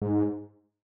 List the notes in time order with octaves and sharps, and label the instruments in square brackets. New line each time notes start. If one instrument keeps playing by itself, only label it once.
[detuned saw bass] G#2